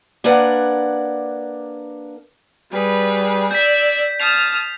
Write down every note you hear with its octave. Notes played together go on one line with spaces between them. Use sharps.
A#3 D4 A#4 B4 D5 F#5
G3 G#4 B4
D5 E6 G6 G#6 B6
A5 D#6 F6 G6 C7 F7